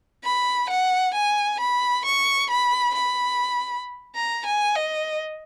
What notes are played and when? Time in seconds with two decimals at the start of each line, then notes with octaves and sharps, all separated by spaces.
0.24 B5
0.70 F#5
1.14 G#5
1.60 B5
2.06 C#6
2.50 B5
2.95 B5
4.15 A#5
4.46 G#5
4.76 D#5